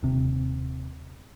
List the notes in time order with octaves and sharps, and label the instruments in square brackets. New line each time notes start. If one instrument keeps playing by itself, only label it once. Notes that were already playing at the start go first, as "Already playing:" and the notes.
[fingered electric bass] D#1 C3